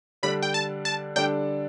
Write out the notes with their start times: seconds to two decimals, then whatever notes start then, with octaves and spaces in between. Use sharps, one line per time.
0.23 D3 G3 D4 A4 D5 B5
0.42 G5
0.54 A5
0.85 A5
1.16 D3 G3 D4 A4 D5 G5